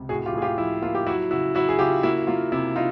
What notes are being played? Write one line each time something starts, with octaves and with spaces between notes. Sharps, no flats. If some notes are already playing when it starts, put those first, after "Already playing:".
Already playing: C#2 C3
A2 F#4 G#4
F4 G4
A2 G#4
F4 G4
F3 E4
A#3 F4
G4
F#3 E4 F#4
C#3 E4 F#4
F#3 E4 F#4
G#4
C#3 F4 G4
A#3 E4 F#4
A#3 F4
C3 E4
D#4 F4